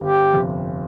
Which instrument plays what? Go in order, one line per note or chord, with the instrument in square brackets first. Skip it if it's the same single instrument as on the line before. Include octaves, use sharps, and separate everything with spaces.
[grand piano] G1 [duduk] G4
[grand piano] F2 C3